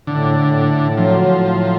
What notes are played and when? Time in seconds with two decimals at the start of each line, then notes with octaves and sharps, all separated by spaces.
0.07 A2 D3
0.37 A2
0.68 A2
0.97 F3 F#3
1.27 A2
1.56 F#3